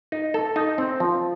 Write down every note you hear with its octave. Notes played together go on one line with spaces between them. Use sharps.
D#4
A4
D#4
C4
F3